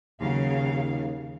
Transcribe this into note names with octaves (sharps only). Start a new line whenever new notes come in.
D#2 C#3 F#3 F5